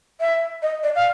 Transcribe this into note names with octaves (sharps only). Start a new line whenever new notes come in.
E5
D#5
D5
F5